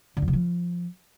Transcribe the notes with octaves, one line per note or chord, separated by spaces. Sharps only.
D3
F2
C3
F3